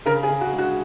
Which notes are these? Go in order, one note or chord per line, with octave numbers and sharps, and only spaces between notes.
C#3 A#4
G#4
C#3
F#4
G#3
F#4